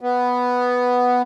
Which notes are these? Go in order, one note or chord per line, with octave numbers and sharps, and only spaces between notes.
B3